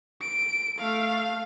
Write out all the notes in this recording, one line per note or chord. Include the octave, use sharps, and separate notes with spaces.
D7
A3 F5